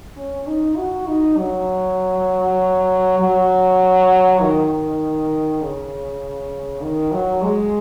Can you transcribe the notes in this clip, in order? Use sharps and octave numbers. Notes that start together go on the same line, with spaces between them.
C#4
D#4
F#4
D#4
F#3
F#3
D#3
C#3
D#3
F#3
G#3